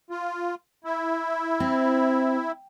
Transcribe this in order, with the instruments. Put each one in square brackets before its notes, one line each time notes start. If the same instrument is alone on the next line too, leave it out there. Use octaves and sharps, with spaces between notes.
[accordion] F4
E4
[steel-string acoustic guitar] C4